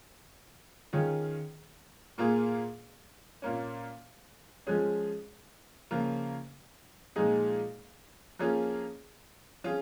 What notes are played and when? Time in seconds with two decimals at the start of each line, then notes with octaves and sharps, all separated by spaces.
0.93 D#3 C#4 F4 G#4
2.18 A#2 A#3 F4 G#4
3.42 A#2 A#3 C#4
4.67 F3 G#3 C#4 G#4
5.91 C#3 F3 A#3 F4
7.16 A#2 F3 G#3 D#4 G#4
8.39 F3 A#3 C#4 F4 G#4
9.64 F3 C#4 F4 G#4